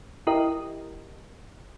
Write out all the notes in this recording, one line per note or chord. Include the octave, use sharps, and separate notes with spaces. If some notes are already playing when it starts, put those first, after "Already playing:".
E4 G4 A#4 D#5